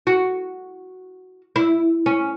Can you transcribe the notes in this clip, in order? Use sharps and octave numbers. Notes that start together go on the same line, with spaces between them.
F#4
E4
C#4